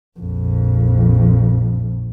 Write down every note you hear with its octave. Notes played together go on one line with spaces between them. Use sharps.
A#1 F2